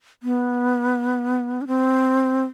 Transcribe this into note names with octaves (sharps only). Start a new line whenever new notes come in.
B3
D4
C4